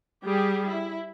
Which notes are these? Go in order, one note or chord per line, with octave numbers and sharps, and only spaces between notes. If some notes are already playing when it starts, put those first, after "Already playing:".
G3 G4 G#4
E4